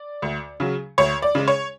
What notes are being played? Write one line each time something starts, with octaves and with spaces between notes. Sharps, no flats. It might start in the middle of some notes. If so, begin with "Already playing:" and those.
Already playing: D5
D2
C#3 F#3
D2 C#5
D5
C#3 G#3
C#5